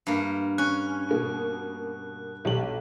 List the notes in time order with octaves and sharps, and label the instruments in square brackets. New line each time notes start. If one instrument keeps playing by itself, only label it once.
[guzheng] G2 A#3
[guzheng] C#4 [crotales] F#6
[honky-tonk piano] B2 A#3 B3
B1 G4 F#7